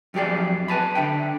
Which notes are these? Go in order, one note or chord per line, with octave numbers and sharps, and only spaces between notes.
F2 F#3 G4 G#4 D5
B4 G#5 A5 B5
D3 E5 G5